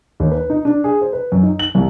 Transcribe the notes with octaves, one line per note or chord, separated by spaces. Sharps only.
D#2
B4
D#4
D4
G#4
C5
B4
F#2
D#4
F#7
C2